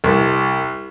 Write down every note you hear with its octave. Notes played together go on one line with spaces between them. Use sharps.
C2